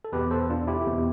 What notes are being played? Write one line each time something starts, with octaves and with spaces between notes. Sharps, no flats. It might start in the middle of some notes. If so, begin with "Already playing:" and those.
A4
E2 B2 G4 B4
A4 C5
D4 F4
E4 G4
E2 B2